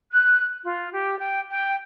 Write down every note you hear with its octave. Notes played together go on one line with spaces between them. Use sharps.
F#6
F4
G4
G5
G5